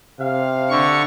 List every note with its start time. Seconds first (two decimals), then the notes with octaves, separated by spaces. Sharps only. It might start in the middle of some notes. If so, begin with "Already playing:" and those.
0.20 C3 F5
0.70 D3 C#6